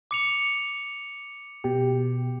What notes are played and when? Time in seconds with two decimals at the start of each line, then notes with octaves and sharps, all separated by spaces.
0.11 D6 C#7 F7
1.64 B2 G4